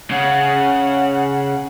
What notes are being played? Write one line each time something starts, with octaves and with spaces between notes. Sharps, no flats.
C#3 F#5